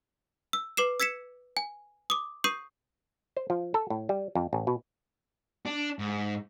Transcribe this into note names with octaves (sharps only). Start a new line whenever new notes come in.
E6
B4 D6 C7 E7
E6 G#6 B6 C#7 E7
G#5
D6 D#6
C#6 D#6 G6 C7 D#7
C5
F3
A4
A2
G3
F2
A1
B2
D4
G#2